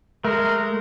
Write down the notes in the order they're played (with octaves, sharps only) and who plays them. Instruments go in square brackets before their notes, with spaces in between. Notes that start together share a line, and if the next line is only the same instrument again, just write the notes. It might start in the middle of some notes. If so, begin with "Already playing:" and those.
[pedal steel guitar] G#3 A3 [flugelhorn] A#4